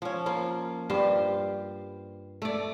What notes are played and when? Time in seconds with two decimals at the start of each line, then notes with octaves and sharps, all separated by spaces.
0.02 F3 C#4
0.26 F3 A#3 F4
0.90 G2 F4 G4 C5
2.42 A3 D5